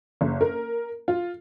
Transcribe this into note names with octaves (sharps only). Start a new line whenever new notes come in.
F#1
A#4
F4